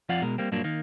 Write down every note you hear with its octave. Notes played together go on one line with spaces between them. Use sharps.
F2 F3 F4 D5 F5 F#5
B2 G#3 A#4
G3 A#3 C4
G2 A#2 F#3 A#3 D4
D#3 A#3